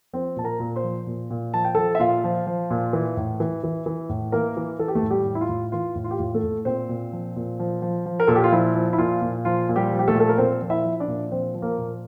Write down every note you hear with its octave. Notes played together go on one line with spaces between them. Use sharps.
F3 C4 C5
A#2 A5
A#4 A#5
A#2
C5 C6
F3
A#2
A#2
F3 A5
G5
F3 A4 A5
E5
A#2 F4 F5
F3
F3
A#2
E3
A2
E3
E3
E3
A2
E3 A#3 A#4
E3
E3 A4
G4
A3 A4
A2
G3 G4
A2
E4
F4
A2
E3 F4
A2
F4
G4
A2 F4
A3 A4
A2
A#2 C4 C5
A#2
F3
A#2
F3
F3
F3
A#4
A#2 A4
G4
F4
F3 E4
F3
E4
A#2 F4
A#2
F3 F4
A#2
G3 G4
F3
G4
A3 A4
A#2
A4
A#4
A#2 C4 C5
F3
E4 E5
F3
D4 D5
A#2
F3 C4 C5
F3
A#3 A#4
A#2